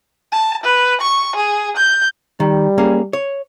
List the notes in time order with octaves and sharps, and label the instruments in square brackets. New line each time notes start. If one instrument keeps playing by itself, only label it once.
[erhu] A5
B4
C#6
G#4
G6
[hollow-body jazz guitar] D#3 [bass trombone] G3
[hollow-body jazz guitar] A#3 C#4 G#4
C#5